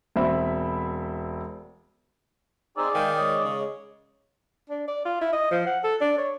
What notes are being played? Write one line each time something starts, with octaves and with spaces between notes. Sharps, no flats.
E1 C4 E5 B5
C4 D#4 G#4 D5 G#5 E6
D#3 G#3 F5 G5 G#5
G#3 C#5 D#5
C#3
D4
D5
F4
E4
D#5
F3
F#5
A4
D4
C#5